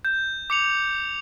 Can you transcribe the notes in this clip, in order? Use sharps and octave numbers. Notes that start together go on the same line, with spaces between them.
G6
D6 C#7 F7